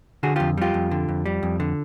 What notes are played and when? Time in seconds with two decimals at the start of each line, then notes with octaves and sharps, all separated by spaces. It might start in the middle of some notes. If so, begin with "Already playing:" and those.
0.23 D3 F#4 G#4
0.36 F2 F4 G4
0.57 G3 F4 G4
0.74 F2
0.91 D3
1.09 F2
1.26 G3
1.43 F2
1.60 D3